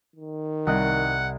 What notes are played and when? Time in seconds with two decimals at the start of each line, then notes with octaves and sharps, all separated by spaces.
0.16 D#3
0.67 C2 D#5 F#5 F#6